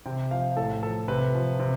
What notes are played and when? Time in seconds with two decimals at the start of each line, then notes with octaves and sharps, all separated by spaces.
0.06 C3 G5
0.31 F3 F5
0.57 A2 A4
0.83 F3 A4
1.08 C3 B4
1.35 F3
1.59 C3